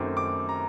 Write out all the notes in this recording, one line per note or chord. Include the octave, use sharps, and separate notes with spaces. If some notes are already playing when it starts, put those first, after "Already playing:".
Already playing: F#2 D#3 F#3 A3 C4 D6
D6
A#5